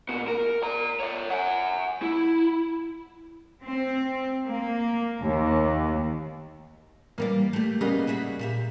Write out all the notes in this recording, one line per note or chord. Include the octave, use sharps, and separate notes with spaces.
A#2 B3
A#4
D5 A#5
C#5 E5
F#5 G#5
E4
C4
A#3
D#2
E3 G3 A#3 D5
A3 G4
C#3 G3 A#3 B3 D#4
F#4 G#4 E5
A#2 G4 E5